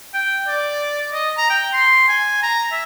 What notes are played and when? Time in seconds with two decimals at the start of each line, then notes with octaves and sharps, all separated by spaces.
0.14 G5
0.48 D5
1.13 D#5
1.37 A#5
1.50 G5
1.73 C6
2.08 G#5
2.42 A#5
2.72 E5